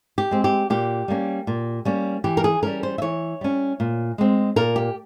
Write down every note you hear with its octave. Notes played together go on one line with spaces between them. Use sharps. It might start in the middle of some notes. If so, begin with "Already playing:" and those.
G4
G#3 C4
G4
A#2 G4
G3 A#3 C#4
A#2
G3 A#3 C#4
E3 G4
A#4
G#4
G3 C#4 A#4
C5
E5
E3 C#5
G3 C#4
A#2
G#3 C4
A#2 A#4
G4